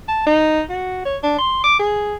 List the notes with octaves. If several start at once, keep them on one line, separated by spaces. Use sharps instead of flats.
A5
D#4
F#4
C#5
D4
C6
D6
G#4